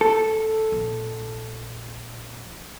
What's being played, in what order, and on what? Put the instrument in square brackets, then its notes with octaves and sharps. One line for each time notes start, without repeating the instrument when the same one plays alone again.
[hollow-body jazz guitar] A4
[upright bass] A#1